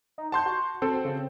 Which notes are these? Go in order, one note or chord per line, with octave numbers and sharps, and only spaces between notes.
D#4
F#5 A5 C6 G6
F#4
C4 A4 C5
C#3